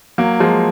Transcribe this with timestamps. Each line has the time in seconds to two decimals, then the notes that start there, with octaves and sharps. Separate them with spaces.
0.18 F#3 A#3
0.40 F3 G#3